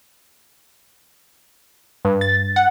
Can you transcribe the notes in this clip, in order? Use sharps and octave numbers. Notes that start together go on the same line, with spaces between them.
G2
A6
F#5